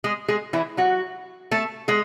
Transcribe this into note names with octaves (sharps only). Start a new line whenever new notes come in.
G#3 G#4
G#3 G#4
E3 E4
F#3 F#4
A3 A4
G#3 G#4